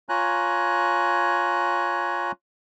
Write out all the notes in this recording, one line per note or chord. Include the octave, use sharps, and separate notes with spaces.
F4 C#5 G#5 A#5 F#6